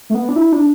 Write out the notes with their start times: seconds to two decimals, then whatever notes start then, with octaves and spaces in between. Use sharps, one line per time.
0.10 A3
0.15 B3
0.29 D4
0.36 E4
0.52 D4